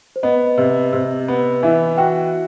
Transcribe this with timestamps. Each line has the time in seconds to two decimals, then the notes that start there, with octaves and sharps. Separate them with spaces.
0.16 C5
0.23 B3 D#5
0.58 C3
0.93 C3
1.28 B3
1.63 E3 E5
1.98 F#4 G5